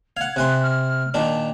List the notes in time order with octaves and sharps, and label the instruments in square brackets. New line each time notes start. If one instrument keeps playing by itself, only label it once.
[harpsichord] F5 F#5 [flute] G#6
[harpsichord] C3 G#5 C6 [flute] F#6
[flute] F6
[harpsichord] A#2 D#3 D4 [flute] A5